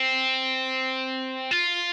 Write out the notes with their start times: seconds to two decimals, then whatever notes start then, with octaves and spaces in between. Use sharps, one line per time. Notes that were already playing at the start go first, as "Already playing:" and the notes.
Already playing: C4
1.51 F4